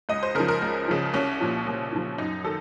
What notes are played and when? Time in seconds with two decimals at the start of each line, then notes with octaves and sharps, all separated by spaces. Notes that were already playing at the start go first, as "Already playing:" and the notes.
0.09 C#2 D#5
0.23 C5
0.35 C#3 A#4
0.40 F3
0.48 A#4
0.62 C#2
0.88 C#3 F3
1.14 C2 C#4
1.41 A#2 F3
1.67 C2
1.92 A#2 F3
2.18 F#2 D#4
2.44 D#3 A4